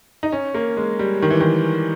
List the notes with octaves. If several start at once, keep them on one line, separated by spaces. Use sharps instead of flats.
D#4
C#4
A#3
G#3
G3
D#3
E3
D#3